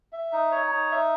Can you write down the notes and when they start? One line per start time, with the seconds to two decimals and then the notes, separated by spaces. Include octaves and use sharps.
0.13 E5
0.32 D#4
0.52 C#5
0.72 D#4
0.91 E5